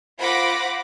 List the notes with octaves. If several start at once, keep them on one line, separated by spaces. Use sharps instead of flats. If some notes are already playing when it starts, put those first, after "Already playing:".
F4 C5 F#5 B5 D6 A#6